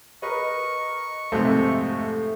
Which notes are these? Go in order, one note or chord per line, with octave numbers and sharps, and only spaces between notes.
A#4 B4 D#5 C#6
F2 G#2 C3 A3 C5